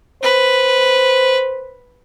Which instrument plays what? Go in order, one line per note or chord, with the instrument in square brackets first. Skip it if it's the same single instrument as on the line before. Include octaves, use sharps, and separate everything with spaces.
[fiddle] B4 [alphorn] C5